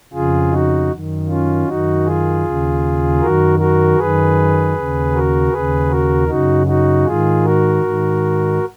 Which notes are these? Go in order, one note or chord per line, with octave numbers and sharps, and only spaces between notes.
F2 C#3 F4 G#4
D#4 F#4
F#2 D#3
C#4 F4
F#2 D#3 D#4 F#4
F4 G#4
D#2 C#3
F#2 D#3 F#4 A#4
F#4 A#4
F#2 D#3 G#4 B4
D#2 C#3
F#4 A#4
D#2 C#3 G#4 B4
F#4 A#4
F#2 C#3 D#4 F#4
D#4 F#4
G#2 D#3 F4 G#4
F#4 A#4
G#2 D#3